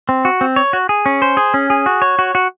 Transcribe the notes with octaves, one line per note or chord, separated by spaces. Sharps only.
C4
F#4
C4
C#5
F#4
G#4
C#4
C5
G#4
C#4
G#4
F#4
C#5
F#4
F#4